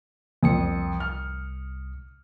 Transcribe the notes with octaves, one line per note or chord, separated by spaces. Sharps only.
C2 F2 D#6 C#7
F6